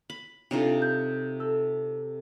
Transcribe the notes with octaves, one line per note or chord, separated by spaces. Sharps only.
B5
C3 D4 D#4 F4 G4 A4 C#5
G6
A4 E6